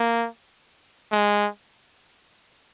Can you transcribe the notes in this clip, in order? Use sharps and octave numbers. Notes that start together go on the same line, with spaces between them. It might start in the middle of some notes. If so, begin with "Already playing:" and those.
Already playing: A#3
G#3